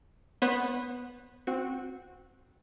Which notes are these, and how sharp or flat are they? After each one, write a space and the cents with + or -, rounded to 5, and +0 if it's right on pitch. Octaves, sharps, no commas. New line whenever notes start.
B3 +0 C5 +45
C4 +0 F#4 -15